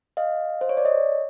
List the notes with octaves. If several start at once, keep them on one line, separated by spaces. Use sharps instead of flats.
D#5 F5
C5
C#5
D5
C#5 D#5